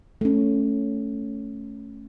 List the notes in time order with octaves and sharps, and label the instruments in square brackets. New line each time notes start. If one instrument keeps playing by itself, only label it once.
[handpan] A3 C#4